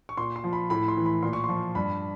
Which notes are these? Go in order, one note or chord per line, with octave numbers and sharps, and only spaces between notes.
C#6
A#2 C6
C6
F3
B5
A2 B5
C6
E3
B5
A#2 C6
C#6
F3 C6
G2 B5